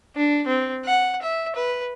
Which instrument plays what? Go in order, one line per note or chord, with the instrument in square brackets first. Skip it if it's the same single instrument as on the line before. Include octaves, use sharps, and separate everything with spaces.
[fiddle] D4
C4
F#5
E5
B4